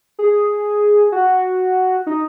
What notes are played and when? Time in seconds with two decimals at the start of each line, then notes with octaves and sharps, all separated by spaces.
0.19 G#4
1.12 F#4
2.07 D#4